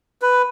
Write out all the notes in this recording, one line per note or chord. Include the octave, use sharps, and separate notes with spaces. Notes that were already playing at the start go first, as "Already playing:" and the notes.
B4